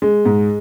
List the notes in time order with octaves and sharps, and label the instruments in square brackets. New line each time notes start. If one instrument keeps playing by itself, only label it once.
[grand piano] G#3
G#2